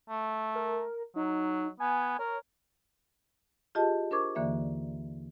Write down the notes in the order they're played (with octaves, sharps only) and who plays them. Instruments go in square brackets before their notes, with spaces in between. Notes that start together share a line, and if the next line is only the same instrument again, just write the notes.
[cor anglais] A3
[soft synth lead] A#4
[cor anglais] F#3 [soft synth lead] D#4
[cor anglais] B3 [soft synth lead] G#5
[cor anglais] A#4 [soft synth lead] C#5
[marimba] F4 G4 G#4 D#5 A5
D4 A#4 C5 C#6 D6 G#6
D#2 D3 E3 A#3 D5 E5